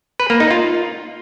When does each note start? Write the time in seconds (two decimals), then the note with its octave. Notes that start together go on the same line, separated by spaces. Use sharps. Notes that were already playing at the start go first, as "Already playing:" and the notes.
0.20 B4
0.30 A#3
0.40 D#4
0.51 F4